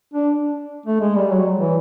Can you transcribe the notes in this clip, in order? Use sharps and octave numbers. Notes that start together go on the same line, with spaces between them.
D4
A3
G#3
G3
F#3
E3